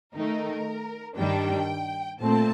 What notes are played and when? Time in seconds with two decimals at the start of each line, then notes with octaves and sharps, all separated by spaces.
0.15 D#3 A3 D#4 A#4
1.17 G2 D#3 G3 D4 G5
2.20 A#2 A3 C4 A5